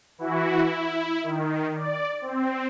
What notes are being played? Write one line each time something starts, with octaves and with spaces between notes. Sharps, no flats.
E3 E4 F#4
E4
D#3
D5
C4